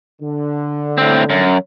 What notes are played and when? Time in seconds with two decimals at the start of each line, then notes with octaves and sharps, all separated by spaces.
0.21 D3
0.98 A2 C4
1.30 F#2